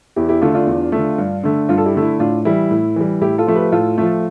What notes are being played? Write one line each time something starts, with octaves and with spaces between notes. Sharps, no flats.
E2 E4 G4
E4 G4
D3 A3 D4 F4
D4 F4
E2
D3 A3
G2
D3 A3
G2 D4 F4
A4
E4 G4
D3 A3
E4
A2 D4 F4
E3 G3 E4
A2
E3 G3
A2 E4 G4
F4 A4
F3 A3
G4 B4
A2 F4 A4
F3 A3